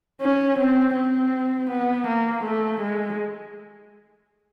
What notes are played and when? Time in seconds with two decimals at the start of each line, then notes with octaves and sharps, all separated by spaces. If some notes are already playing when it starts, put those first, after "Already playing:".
0.21 C#4
0.59 C4
0.96 C4
1.70 B3
2.08 A#3
2.44 A3
2.81 G#3